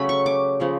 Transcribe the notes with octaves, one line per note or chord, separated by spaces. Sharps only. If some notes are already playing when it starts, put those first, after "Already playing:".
Already playing: C#3 F#3 A3 C#4 B5
C#6
D6
C#3 F3 G#3